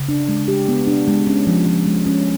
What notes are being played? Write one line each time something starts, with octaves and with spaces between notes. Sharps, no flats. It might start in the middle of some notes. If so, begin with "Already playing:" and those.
Already playing: C#3
D4
G#3
G4
B3
D4
G#3
C#4
F3
F3
G#3
C#4